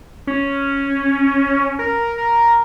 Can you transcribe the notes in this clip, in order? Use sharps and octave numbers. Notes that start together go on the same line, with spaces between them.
C#4
A#4
A#4